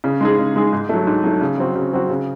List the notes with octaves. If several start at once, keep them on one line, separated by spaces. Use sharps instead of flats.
C#3
G#3 D#4 G#4
C#3
G#3 D#4 G#4
G#2
F#3 A3
G#2
F#3 A3
C#3
F#3 C4 F#4
C#3
F#3 C4 F#4
C#3